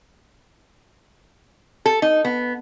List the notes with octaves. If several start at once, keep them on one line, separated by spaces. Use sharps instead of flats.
A4
D#4
B3